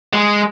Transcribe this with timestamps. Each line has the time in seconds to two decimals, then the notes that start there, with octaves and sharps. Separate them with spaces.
0.13 G#3